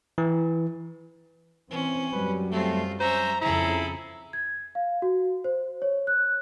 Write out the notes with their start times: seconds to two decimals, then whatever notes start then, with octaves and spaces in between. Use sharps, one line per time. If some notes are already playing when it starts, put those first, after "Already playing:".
0.18 E3
1.70 E3 C4 C#4
2.12 F#2 F#3 G3 B4
2.51 A3 C4 F4
3.00 C#4 C5 E5 A#5
3.41 F2 C#3 E4 G#4 A4 A#5
4.33 G#6
4.75 F5
5.02 F#4
5.44 C5
5.82 C#5
6.07 F#6